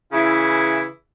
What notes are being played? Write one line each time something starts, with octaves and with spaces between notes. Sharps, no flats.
C#3 E3 E4